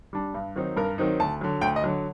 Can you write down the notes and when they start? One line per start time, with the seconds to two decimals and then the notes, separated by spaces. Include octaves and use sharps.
0.13 G3 D4
0.34 G2
0.56 D#3 F#3 C4 D#4
0.77 G2 A#4
0.98 D#3 F#3 C4 D#4
1.20 D2 A5
1.41 D3 F#3
1.61 D2 G5
1.76 D#5
1.84 D3 F#3